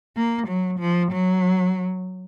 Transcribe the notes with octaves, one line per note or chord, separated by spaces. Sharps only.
A#3
F#3
F3
F#3